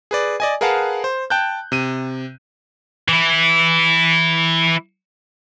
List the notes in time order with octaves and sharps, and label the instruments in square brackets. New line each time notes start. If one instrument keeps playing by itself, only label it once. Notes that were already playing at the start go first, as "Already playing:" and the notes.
[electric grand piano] G#4 B4 D5
D5 D#5 G#5
G#4 A#4 B4 F5 F#5 A5
C5
G5 A5 F#6 G6
C3 D#7
[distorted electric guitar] E3 E4